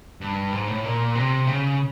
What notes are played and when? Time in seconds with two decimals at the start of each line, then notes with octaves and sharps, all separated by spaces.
0.21 G2
0.53 G#2
0.68 A2
0.84 A#2
1.15 C3
1.47 C#3